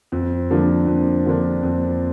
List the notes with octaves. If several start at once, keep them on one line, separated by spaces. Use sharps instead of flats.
F2
D3 F3 A#3 D4
F2
D3 F3 A#3 D4
F2